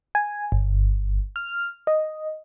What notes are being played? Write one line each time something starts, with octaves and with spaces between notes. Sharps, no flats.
G#5
G1
F6
D#5